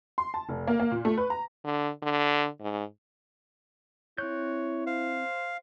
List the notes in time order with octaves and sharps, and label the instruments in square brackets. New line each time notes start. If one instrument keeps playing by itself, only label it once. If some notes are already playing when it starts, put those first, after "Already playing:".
[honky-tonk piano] C6
A5
F1
A#3
A#3
A#2
A3
B4
A#5
[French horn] D3
D3
G#2
[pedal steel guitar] C4 F#6 G6 [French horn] E4 [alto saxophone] C#5
[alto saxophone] C5 [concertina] F5